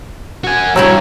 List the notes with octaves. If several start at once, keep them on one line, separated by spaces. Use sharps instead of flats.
F#4 G#5
E2 G2 E4 F#4 C#5 G5 A#5 E6